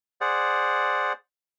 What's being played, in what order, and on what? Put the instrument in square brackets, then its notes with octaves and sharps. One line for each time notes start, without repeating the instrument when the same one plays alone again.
[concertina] G#4 C5 D5 F#5